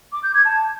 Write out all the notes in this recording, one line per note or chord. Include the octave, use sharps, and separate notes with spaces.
D6
G6
G#6
A5